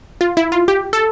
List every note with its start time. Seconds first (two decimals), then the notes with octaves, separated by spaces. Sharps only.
0.21 F4
0.37 E4
0.52 F4
0.68 G4
0.93 A4